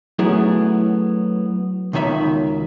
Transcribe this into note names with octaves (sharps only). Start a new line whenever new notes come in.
F#3 A3 B3 C#4 E4 G#4
C#2 B2 D#3 C#5 E5 B5